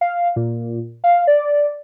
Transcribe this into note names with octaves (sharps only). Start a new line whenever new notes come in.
F5
A#2
F5
D5